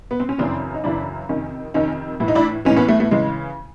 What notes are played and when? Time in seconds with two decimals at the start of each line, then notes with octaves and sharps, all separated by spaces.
0.11 B3
0.20 C4
0.29 C#4
0.38 F#2 C#3 E3 C4 D4
0.74 D#4
0.84 F#2 C#3 E3 D4 E4
1.29 F2 C3 D#3 C#4 D#4
1.74 F2 C3 D#3 C#4 D#4
2.20 A2 E3 E4
2.28 D#4
2.35 D4 E4
2.65 E3 C#4 D#4
2.71 A2
2.76 B3 C#4
2.88 A3 B3
3.00 A3 B3
3.11 C#3 E3 G#3